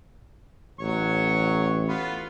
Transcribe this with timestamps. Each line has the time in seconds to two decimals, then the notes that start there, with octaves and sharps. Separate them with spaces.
0.80 A1 F#3 C#5 C#6
1.89 B3 F4 B5